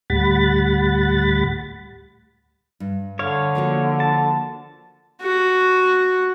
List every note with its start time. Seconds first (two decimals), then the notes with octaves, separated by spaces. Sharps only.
0.10 D2 A2 G3 F#5 B5 A6
2.80 G2
3.19 D3 C#5 F5
3.55 F3 A#3 F#4
4.00 A5
5.22 F#4